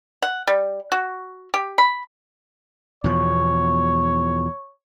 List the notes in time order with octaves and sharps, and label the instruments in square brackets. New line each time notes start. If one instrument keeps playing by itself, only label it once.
[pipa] F#5
G3
F#4
G4
B5
[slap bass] E2 B2 F3 [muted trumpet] C#5